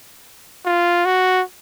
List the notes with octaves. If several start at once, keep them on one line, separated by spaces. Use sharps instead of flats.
F4
F#4